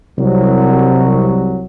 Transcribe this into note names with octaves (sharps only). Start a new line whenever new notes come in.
C2 F#3